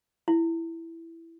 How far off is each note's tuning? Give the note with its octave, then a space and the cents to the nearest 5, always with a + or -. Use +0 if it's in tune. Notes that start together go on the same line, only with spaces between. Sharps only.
E4 +5